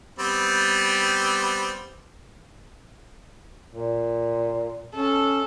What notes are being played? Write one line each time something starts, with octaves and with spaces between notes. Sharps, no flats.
G3 B3 C4
A#2
C#4 A4